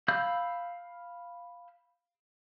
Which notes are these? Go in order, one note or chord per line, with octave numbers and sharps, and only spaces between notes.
F5 B5 E6 G6